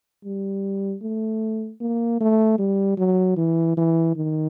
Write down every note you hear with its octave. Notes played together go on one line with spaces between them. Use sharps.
G3
A3
A#3
A3
G3
F#3
E3
E3
D#3